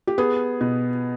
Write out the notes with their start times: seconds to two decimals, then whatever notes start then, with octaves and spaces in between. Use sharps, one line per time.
0.07 G4
0.18 B3 G#4
0.61 B2